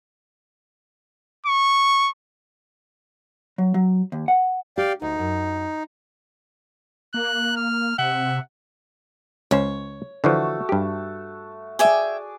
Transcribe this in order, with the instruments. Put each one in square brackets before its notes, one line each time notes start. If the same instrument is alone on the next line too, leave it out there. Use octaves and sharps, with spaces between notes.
[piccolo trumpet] C#6
[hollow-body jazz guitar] F#3
F#3
D#2
F#5
[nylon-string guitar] G4 [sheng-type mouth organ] D5 F5 G5
[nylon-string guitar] D2 [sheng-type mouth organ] D#4
[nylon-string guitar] F#2
[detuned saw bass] A#3 [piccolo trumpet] F#6
[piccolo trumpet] F6
[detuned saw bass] C3 [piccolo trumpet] E5 [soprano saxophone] F#5
[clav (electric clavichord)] C#2 C#4 C5 [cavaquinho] C#5
[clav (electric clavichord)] D3 E3 F3 [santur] A3 F#4
[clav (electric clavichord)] G2 G4
[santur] G#4 D5 D6 [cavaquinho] E5 G5 G#5